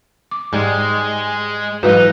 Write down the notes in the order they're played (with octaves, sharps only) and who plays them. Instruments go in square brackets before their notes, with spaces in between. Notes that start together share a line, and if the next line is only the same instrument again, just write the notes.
[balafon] D6
[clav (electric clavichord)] G#2 G3 [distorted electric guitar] G#3
[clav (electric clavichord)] G#2 E3 [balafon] F#3 G#3 F#4 [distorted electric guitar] D#4 [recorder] B4